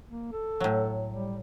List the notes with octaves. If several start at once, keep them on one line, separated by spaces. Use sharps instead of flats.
A#3
A4
A2 F#3
G3